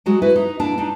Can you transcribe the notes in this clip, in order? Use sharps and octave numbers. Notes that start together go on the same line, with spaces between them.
F#3 G#3 F#4
E4 F#4 B4
D#4
A#3 D4 E4 A5
D4 D#4